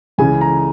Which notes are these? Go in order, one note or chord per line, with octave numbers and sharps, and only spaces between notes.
C#2 C#3 E3 G#5
A#5